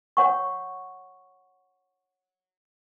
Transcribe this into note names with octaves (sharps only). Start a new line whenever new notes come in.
C#5 F#5 C#6